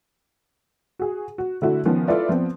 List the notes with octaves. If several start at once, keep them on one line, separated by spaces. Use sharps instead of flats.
F#4 G#4
F#4
D3 A3 E4 F#4
D#3 F3 B3 C#4
E4 F4 A4 B4 D5 E5
F3 B3 C4